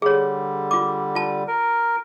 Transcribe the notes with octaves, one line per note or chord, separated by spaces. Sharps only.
D3 G3 G#4 C#5
F4 D6
F4 A5
A#4